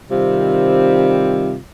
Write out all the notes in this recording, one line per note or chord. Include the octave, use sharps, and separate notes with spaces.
C3 D#3 G3 C4 F4